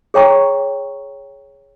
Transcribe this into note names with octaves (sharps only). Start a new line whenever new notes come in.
G#4 C#5 G5 A#5 C#6